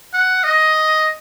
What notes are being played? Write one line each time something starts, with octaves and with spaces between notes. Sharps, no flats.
F#5
D#5